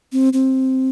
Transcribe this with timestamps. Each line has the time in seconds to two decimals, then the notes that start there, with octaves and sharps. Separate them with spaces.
0.12 C4
0.33 C4